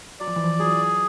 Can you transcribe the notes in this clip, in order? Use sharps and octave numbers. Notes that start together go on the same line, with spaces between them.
F#3 D5
F3
E3
F3
F#3 G#4